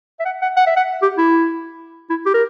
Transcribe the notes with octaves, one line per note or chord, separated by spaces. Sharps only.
E5
F#5
F#5
F#5
E5
F#5
G4
E4
E4
G4
A#4